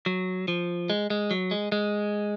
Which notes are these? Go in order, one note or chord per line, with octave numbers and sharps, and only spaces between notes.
F#3
F3
G#3
G#3
F#3
G#3
G#3